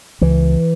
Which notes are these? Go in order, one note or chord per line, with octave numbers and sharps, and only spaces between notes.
C#2 E3